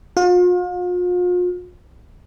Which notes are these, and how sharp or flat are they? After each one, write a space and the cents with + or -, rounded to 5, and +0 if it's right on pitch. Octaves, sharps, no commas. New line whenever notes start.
F4 +40